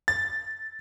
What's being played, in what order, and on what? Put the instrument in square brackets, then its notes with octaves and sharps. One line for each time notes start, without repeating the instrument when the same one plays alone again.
[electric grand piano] A6